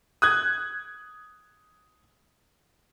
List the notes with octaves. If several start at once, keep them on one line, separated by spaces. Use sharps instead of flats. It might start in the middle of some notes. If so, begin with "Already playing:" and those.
D#6 F#6 G#6